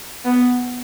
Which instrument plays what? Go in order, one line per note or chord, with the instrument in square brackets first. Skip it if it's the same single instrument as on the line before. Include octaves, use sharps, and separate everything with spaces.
[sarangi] B3